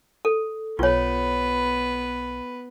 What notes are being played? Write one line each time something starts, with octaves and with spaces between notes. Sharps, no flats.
A4
B1 B3 F4 B4 C#5